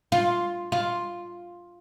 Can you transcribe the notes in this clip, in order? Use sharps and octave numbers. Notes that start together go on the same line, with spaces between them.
F4
F4